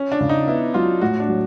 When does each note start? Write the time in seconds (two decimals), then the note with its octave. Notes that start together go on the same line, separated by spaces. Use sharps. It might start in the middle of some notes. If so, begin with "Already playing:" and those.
Already playing: C#4
0.12 D4
0.21 C#3
0.29 D#4
0.47 B3 E4
0.74 F#3 F4
1.01 A2 F#4
1.20 D4
1.29 F#3